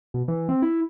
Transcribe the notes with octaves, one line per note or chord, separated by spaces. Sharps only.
B2
E3
C4
E4